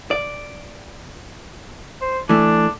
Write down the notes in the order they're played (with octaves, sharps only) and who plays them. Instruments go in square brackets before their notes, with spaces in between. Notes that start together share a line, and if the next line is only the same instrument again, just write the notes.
[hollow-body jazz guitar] D5
[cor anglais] C5
[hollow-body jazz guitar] E3 A3 [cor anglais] D4